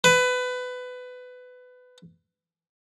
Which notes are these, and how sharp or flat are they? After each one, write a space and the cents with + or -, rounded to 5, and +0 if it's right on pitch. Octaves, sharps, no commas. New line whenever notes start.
B4 +20